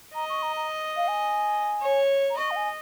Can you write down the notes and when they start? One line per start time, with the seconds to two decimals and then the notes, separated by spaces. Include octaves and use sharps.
0.15 D#5 A#5
0.29 C#6
0.43 A#5
0.57 A#5
0.97 F5
1.08 G#5
1.81 C#5
2.30 A#5
2.37 D#5 C#6
2.51 F5
2.56 G#5